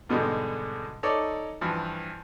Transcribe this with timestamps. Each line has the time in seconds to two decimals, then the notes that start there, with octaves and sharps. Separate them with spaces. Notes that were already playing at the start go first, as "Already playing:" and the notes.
0.09 G#2 B2 D3 G3 G#3
1.03 D#4 A4 C#5 D5
1.61 G2 E3 F3